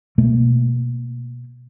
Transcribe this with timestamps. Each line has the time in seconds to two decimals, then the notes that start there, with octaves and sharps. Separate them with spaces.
0.18 B2 A3 A#3